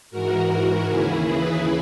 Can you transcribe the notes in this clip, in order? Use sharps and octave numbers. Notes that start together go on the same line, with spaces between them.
G#2 E3 F#4 A#4
D#2 C#3 E3 E4 G#4
G#4 B4